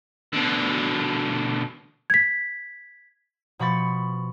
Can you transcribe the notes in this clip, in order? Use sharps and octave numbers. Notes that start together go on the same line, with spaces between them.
B2 D3
G#6 B6
B2 F3 B5 C#6 A6